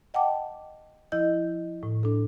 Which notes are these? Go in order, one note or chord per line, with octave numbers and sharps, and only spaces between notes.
D#5 F#5 G5 A5 D6
F3 E4 D#5 G6
A2
D4 A4